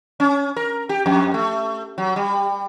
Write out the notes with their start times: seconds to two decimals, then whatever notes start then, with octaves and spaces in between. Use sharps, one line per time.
0.20 C#4
0.56 A#4
0.89 G4
1.06 F2
1.34 A3
1.98 F#3
2.16 G3